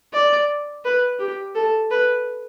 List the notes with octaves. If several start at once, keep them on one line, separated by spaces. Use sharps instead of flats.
D5
B4
G4
A4
B4